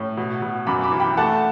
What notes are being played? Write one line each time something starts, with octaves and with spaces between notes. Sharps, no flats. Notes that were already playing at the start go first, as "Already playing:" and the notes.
Already playing: A2 C#4
B2
B2
F#2 B5 D6
B5 D6
E3
G5 B5
A3 F#5 A5